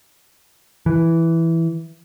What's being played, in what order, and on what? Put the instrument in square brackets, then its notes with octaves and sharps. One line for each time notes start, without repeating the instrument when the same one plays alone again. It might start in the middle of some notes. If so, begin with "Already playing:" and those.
[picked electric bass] E3